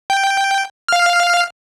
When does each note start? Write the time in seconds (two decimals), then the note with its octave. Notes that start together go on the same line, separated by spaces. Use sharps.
0.10 G5
0.88 F5 F6